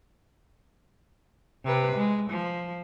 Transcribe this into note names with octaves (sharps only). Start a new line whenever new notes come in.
C3 B4
G#3
F3